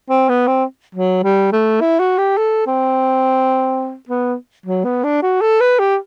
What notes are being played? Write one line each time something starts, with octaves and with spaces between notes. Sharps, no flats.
C4
B3
C4
F#3
G3
A3
E4
F#4
G4
A4
C4
B3
F#3
B3
D4
F#4
A4
B4
G4